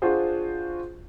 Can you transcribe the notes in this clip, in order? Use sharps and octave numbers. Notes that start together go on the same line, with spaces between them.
D4 F4 F#4 G#4 C5